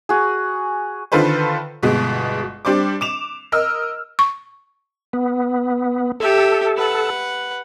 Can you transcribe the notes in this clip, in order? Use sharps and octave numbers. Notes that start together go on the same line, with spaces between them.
F#4 G#4
D3 D#3 F4 A4 B4 C5
G1 B2 G#3
G3 D4 C5 D6
D6 E7 F7
A#4 D#5 E6 F6
C#6
B3
G4 A4 E5
B4 F#5